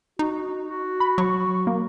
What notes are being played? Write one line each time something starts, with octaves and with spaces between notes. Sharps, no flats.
D#4 F#4
F#4
B5
F#3 C#6
A#3